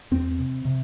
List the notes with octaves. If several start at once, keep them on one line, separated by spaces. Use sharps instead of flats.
E2 C4
C3
C3